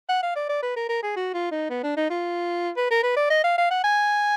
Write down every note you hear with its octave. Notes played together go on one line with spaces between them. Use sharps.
F#5
F5
D5
D5
B4
A#4
A#4
G#4
F#4
F4
D#4
B3
D4
D#4
F4
B4
A#4
B4
D5
D#5
F5
F5
F#5
G#5